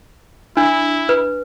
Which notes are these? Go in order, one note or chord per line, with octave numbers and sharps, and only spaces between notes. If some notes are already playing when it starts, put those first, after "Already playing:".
D4 E4
B4